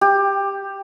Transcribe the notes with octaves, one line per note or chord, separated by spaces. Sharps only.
G4